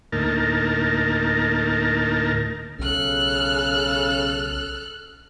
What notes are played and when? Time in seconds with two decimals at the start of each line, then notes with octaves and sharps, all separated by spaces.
0.12 D2 A2 A#3 D#4 A#4 A5
2.79 B1 C#3 A4 F6 F#6